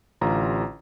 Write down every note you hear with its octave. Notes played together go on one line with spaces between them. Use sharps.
A1 D3 F4 G4 A#5